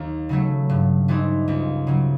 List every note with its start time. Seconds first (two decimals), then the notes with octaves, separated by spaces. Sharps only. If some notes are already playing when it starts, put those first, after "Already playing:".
Already playing: D#2
0.29 C#3 F#3 A3
0.70 G2
1.08 E3 G3 C4 D#4
1.48 C#2
1.87 C#3 F#3